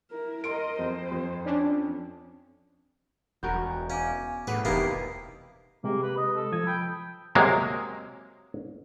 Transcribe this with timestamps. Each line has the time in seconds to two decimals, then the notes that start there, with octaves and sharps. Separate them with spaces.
0.11 E4 A#4
0.44 A#4 D#5 C6 D7
0.79 F2 C5
1.12 F2
1.45 C#4 D4
3.43 E1 B3 F#4 A#4 G6
3.90 C#4 F5 G#5 D6
4.47 A2 G#4 B4 F#5 D6
4.65 E1 C3 A#3 B3 D#4 E4 G4 C7
5.84 C3 G#3 A#3 G4
6.02 B4
6.17 D#5
6.36 A4
6.52 F3 D#6 G#6
6.67 G5 B5
7.35 C3 F#3 G#3 A#3